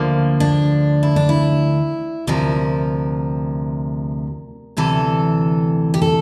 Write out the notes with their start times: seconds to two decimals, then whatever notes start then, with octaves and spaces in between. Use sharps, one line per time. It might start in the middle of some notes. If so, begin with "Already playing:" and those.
Already playing: D2 D3 F3 A#3
0.40 D4
1.03 E4
1.16 D4
1.29 E4
2.27 D2 C3 F3 A#4
4.77 D2 C3 E3 A4
5.94 G4
6.02 A4